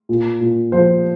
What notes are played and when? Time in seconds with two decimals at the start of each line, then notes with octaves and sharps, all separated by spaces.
0.09 A#2
0.41 A#2
0.72 F3 C5